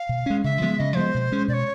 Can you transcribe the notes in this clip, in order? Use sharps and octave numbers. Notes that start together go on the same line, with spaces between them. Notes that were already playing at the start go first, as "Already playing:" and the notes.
Already playing: F5
B2
G#3 C#4
C#3 E5
F3 G#3 B3
C#3 D#5
F3 G#3 B3 C5
B2
G#3 C#4
B2 D5
C#5